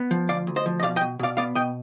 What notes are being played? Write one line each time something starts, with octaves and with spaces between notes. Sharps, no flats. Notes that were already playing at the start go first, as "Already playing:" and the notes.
Already playing: B3
F3
D2 D5 F5
D2
C5 D#5
F3
D#5
B2 D5 F5
D#5 G5
B2
B2 D5 F5
B3 D5 F5
B2 D#5 G5